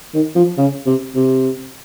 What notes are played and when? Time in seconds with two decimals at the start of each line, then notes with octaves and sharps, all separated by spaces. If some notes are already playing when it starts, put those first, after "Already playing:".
0.14 D#3
0.36 F3
0.58 C#3
0.86 C3
1.15 C3